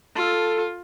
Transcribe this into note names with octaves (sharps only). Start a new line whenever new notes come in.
F4 A4